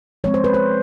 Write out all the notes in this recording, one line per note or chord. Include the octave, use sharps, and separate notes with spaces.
F3 G#3 C4 C#5
C5
B4
C5